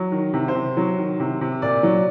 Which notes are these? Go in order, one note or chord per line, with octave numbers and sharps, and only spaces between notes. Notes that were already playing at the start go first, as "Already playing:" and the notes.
Already playing: F#3
D#3
C3
C5
C3
F#3
D#3
C3
C3
A#2 D5
F#3